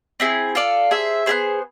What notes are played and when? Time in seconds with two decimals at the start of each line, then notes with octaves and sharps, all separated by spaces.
0.20 C4 E4 G#4
0.55 F4 A4 D5 F5
0.91 G#4 C5 E5
1.26 B3 E4 G#4 C5